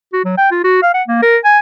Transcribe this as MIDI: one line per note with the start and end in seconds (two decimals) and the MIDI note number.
0.13 0.21 66
0.25 0.37 54
0.38 0.50 79
0.51 0.59 65
0.64 0.79 66
0.83 0.90 77
0.94 1.03 78
1.08 1.18 58
1.22 1.37 70
1.44 1.59 80